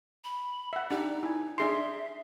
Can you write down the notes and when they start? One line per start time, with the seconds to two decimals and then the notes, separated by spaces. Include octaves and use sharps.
0.24 B5
0.73 E5 F#5
0.91 D4 D#4 G4
1.23 E4 G#5
1.58 D4 G#4 E5 C6